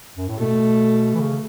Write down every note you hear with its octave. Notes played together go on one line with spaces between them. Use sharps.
F#2
A2
B2 A3
E3
C#3